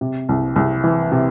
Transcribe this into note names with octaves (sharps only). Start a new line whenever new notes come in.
C3
C2
C2
E3
C3